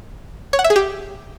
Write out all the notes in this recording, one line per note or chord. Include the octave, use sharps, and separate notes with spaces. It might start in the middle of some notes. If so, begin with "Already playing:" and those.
C#5
F#5
E5
G#4
G4